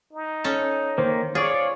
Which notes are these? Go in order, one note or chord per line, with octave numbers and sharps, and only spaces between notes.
D#4
C#4 A4
D#3 A#3 C5
F4 G#4 C#5 D5